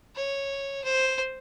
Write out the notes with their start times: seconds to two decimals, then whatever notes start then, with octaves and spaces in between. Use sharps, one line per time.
0.16 C#5
0.84 C5